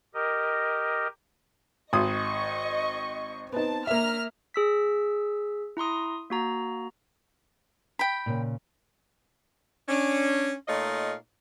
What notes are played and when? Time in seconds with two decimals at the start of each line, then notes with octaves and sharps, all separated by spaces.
0.14 G4 A#4 D#5
1.93 G#1 D#5 C6 C#6 D#6
3.52 B3 C4 D#4 A5
3.87 A#3 E5 A#5 F6
4.54 G#4 E6 B6
5.77 E4 A#5 C6 D#6
6.30 A#3 F#4 A#5
7.99 G5 B5
8.26 A#2 C#3
9.89 C#4 D4
10.68 A#2 A3 D#4 F4 C#5 D#5